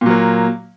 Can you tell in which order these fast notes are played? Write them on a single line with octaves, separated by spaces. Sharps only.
A#2 F#3 A#3